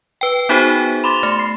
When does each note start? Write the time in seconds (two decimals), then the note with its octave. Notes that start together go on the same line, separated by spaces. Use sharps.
0.21 B4 G5
0.49 B3 D#4 F#4 G#4 C5
1.04 B5 C6 D6 A6
1.23 A3
1.39 C7